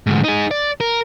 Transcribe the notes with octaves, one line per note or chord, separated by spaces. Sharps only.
D2 G#2
D#4 G#4
D5
A#4